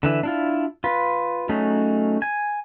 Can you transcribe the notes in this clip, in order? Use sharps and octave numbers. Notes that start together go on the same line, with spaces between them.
D3 E3 E5
D4 E4 F4
F4 B4
F#3 A3 C#4 D#4 G#4
G#5